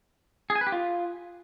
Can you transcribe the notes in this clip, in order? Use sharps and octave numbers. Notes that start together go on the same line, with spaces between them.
G#4
G#5
B4
G4
F4